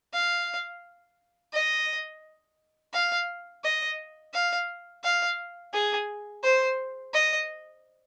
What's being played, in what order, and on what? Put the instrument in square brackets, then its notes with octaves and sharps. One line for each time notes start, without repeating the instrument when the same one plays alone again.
[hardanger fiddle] F5
D#5
F5
D#5
F5
F5
G#4
C5
D#5